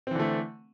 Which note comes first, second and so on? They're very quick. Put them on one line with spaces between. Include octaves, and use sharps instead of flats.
C4 E3 D3 A3